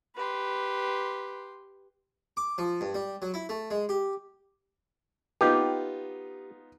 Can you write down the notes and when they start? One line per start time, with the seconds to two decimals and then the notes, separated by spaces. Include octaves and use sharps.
0.16 G4 B4 C6
2.37 D6
2.58 F3
2.81 G2
2.95 G3
3.22 F#3
3.34 E4
3.49 A3
3.71 G#3
3.89 G4
5.41 B3 D#4 F4 G4